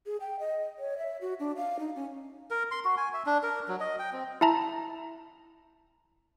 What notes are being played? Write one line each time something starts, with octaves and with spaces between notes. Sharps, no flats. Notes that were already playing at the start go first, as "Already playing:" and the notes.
G#4
G5
D#5
C#5
E5
F#4
D4
F5
D#4
C#4
A#4
C6
F#4
G#5
E5
D4
A#4
F#3
D#5
G5
C4
E4 E5 A5 A#5